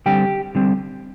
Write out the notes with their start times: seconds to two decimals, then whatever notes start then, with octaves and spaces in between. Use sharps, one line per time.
0.06 D3 G3 C4 G4 G5
0.55 D3 G3 C4